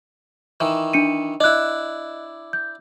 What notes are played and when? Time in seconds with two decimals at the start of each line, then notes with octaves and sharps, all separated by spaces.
0.60 D#3 E3
0.93 D4 C#7 D#7
1.40 D4 E4 D#5 F#6
2.53 G6